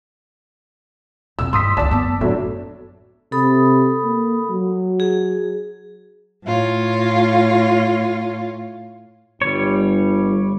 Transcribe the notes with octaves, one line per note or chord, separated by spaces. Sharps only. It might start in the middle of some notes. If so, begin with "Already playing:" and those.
F2 B2 E6
G2 E4 C6 D#6 B6
C#2 D#3 D5 A5 E6
F#2 B3
A2 F#3 B3 D4
C3 A4 B5 D#6
A#3
F#3
G#4
A2 F4 C#5
G1 G3 C#5